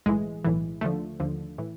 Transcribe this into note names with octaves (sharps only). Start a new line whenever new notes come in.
B1 A2 E3 G#3
B1 A2 E3
D#2 D3 F3 A3
D#2 D3 F3
A2 E3